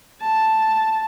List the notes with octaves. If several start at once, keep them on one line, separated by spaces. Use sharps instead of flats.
A5